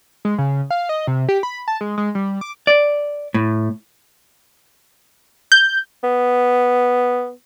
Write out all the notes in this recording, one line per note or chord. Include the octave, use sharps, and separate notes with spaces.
G#3
C#3
F5
D#5
C3
G4
B5
A5
G#3
G#3
G3
D6
D5
A2
G6
B3